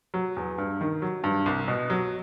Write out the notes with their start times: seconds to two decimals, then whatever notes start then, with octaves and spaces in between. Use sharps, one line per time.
0.14 F#3
0.36 E2
0.58 G2
0.81 D#3
1.02 F#3
1.24 G2
1.46 C2
1.68 B2
1.90 F#3